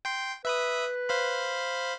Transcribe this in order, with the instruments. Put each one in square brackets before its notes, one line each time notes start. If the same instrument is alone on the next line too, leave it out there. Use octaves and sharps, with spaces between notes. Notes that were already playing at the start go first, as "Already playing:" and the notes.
[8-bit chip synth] G5 C6
[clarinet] B4 [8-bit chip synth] E5 B5 D#6
[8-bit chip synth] C5 F5 B5